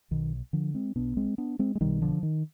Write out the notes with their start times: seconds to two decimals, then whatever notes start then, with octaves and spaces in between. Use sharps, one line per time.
0.11 B1 B2 D#3
0.53 D3 F3
0.74 G#3 C4
0.96 B1 B2 B3 D4
1.17 G#3 C4
1.38 B3 D4
1.59 G#3 C4
1.75 G#3
1.81 B1 B2 D#3 G3
2.02 D3 F3
2.23 D#3